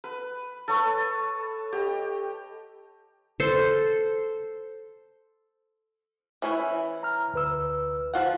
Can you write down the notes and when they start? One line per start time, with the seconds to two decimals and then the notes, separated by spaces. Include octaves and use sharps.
0.04 B4
0.68 A4 B4 C#5 C#6
1.72 G4 D#5
3.40 A4 C5
6.42 E3 C#4 E4
7.03 A#5 F6
7.34 D2 B4 E6
8.14 F3 F4 F#5